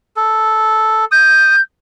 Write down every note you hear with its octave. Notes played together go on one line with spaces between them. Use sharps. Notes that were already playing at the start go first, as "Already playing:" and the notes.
A4
D#6 G6